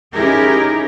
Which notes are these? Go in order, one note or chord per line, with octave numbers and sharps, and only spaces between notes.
C#4 D#4 E4 G4 G#4 A#4